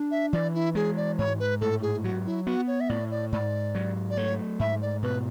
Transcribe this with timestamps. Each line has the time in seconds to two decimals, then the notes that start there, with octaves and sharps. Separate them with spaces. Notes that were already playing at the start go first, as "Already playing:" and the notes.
Already playing: D4
0.11 E5
0.33 E3 D5
0.55 E4
0.75 G#3 G#4
0.97 D5
1.18 G#2 C#5
1.40 B4
1.61 A2 A4
1.82 G#4
2.04 F#3 F#4
2.26 E4
2.46 B3 F#4
2.67 C#5
2.80 E5
2.89 A2 D5
3.11 D5
3.32 G#2 D5
3.75 F#3
4.10 D5
4.17 A3 C#5
4.60 G#2 E5
4.82 D5
5.03 B2 B4